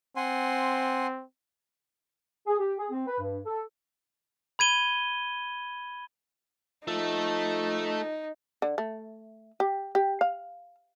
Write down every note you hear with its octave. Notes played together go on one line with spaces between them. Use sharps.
C4 F#5 G#5 C6
G#4
G4
G#4
C4
B4
G2
A4
B5 G#6 D#7 G7
F3 A3 D#4 A4
D3
A3
G4
G4
F5